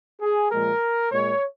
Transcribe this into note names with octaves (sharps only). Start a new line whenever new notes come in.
G#4
A#2 F3 G#3 A#4
A#2 G#3 C#5